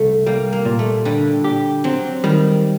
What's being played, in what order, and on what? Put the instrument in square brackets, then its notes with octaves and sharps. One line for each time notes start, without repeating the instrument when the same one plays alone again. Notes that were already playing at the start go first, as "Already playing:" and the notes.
Already playing: [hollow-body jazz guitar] C2 [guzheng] A3
[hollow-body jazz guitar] G3 [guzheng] A#3
[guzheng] A#3
[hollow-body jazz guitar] A#2
[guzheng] A3
[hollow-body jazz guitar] D3 [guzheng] G3
[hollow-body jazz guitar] G4
[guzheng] F#3 [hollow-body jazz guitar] C4
[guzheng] D#3 [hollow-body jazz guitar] G3